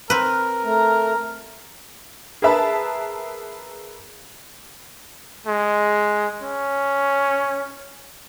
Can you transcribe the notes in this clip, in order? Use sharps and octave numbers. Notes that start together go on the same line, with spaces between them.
C4 A#4 B4
A3 A#5
G#4 A#4 B4 E5 A5 B5
G#3
C#4